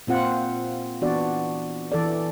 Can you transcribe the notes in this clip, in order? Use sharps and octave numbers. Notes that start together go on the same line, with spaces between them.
A#2 C4 F4 F#5
E3 B3 D4 F#4 D5
E3 A4 D5